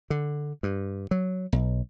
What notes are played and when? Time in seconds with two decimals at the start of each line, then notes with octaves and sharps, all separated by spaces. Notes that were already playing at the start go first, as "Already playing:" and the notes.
0.10 D3
0.63 G2
1.11 F#3
1.52 B1